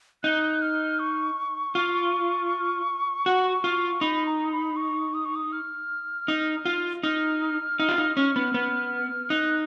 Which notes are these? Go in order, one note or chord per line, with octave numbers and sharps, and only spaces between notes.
D#4 F#6
F6
C#6
F4
F#4
F4
D#4 B5
A#5
B5
C#6
D#6
C#6
D#6
F6
D#4
F4
D#4 F6
D#4
F4
D#4
C#4
B3
B3
D#4 F#6